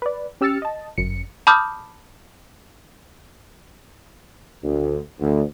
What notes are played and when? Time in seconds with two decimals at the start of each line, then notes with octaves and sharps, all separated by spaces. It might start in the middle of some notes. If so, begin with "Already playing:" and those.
0.02 B4 D5
0.41 C#4 G4 E6 F6 A6 C#7
0.62 D#5 A5
0.98 G1 F#2 C#7
1.47 A5 B5 D6 D#6 F6 G6
4.63 D2
5.19 D2